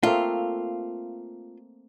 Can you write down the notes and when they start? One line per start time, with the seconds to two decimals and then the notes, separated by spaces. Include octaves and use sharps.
0.03 A3 A#3 C4 F4